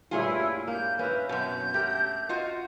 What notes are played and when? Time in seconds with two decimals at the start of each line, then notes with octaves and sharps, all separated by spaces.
0.11 G2 A#2 A3 E4 F4 G#4 C#5
0.67 A#3 G6
0.99 A#3 C#4 E4 B4
1.29 F#2 B2 G6
1.74 A3 G4 A#4
2.29 F4 F#4 D#5